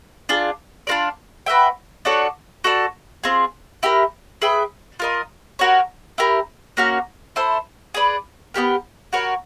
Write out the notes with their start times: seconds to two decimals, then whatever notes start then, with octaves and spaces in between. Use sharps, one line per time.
0.29 D4 F4 G#4
0.87 D4 F4 A#4 D5
1.46 F#4 B4 E5 G5
2.05 D4 F#4 A4 C#5
2.64 F#4 A4 D5
3.24 C4 F4 G#4
3.83 E4 G4 A#4
4.42 G#4 B4 E5 G5
5.00 F4 A#4 D#5
5.59 F#4 A#4 C#5
6.18 E4 G4 A#4
6.77 A#3 C#4 F#4 A#4
7.36 E4 A4 C5
7.94 G#4 B4 D5
8.54 B3 D4 G4 A#4
9.13 F#4 A#4 C#5